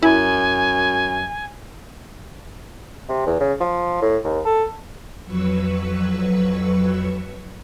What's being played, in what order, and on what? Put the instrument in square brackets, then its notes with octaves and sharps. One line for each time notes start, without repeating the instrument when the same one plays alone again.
[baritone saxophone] F#2 [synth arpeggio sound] E4 [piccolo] G#5
[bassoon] C3
E2
C#3
F3
A2
D#2
A4
[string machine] F2 F#3 B4 C#6 E6